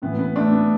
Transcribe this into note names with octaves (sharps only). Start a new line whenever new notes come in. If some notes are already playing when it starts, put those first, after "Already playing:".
A2 E3 B3
B3
A3 D4
B3